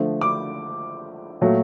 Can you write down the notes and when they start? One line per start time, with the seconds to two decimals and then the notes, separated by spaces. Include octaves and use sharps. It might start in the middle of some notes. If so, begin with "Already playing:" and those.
Already playing: D3 F3 A3
0.21 D6
1.41 A#2 F#3 A3